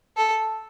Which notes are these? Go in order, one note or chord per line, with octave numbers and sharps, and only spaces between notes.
A4